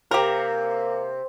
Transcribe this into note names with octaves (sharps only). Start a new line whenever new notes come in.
C3 A#3 G4 A#4